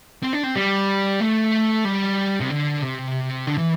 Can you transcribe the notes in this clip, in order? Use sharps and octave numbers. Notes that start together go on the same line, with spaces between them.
C4
D4
C4
G3
A3
G3
C3
D3
C3
D3
E3